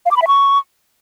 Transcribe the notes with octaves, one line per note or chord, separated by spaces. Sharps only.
F5
D6
B5
E5
C#6